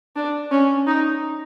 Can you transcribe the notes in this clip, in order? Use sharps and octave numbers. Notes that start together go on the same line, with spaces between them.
D4
C#4
D#4